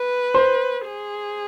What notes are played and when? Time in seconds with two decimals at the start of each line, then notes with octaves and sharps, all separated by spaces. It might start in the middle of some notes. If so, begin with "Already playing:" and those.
Already playing: B4
0.34 C5
0.86 G#4